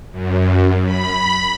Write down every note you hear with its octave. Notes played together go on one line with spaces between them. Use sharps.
F#2
B5